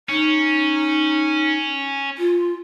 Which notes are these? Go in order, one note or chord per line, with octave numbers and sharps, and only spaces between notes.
C#4 D#4
F4